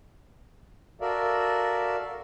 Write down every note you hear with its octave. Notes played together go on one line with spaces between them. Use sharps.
F#4 A4 A#4 D5 E5 F5